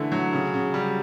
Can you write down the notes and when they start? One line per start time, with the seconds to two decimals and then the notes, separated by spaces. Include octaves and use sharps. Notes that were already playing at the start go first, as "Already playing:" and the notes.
Already playing: D3 E3 A3
0.12 F#3
0.33 C#3
0.54 C#3
0.74 G3